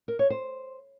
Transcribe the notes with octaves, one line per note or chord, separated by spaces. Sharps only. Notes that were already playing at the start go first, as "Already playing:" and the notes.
A#4
C#5
C5